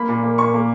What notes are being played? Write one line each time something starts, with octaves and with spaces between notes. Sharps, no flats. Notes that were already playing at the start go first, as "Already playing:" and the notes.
Already playing: A#3 B5
A#2
A#3
A#2 C#6
A#3